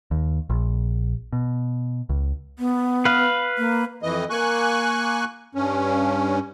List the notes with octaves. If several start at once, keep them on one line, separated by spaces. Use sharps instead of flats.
D#2
A#1
B2
C#2
B3
B4 F5
A#3
F2 E3 D#5
A#3 G#5 C#6 F#6
G2 C#4